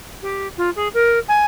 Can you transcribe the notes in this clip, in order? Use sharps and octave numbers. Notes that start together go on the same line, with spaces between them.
G4
F4
G#4
A#4
G#5